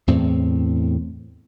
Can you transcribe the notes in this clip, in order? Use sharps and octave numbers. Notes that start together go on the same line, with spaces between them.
E2 A2 C4